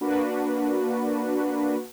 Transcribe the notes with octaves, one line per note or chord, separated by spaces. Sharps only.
A#3 D4 F#4 B4